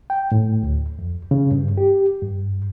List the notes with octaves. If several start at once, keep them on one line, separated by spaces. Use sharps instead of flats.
G5
A2
D2
F2
C#3
G2
G4
G2